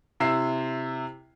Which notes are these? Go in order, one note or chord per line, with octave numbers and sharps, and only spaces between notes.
C3 E4 E6 C7